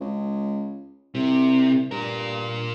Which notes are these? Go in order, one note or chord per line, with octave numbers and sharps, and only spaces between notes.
C#2
C2 C3
G2 A#2 A#4